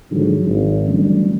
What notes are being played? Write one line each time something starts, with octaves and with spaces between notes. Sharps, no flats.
G#2 D3 D#3 F3 F#3
G#1
D3 E3 F#3 G3 A3 C#4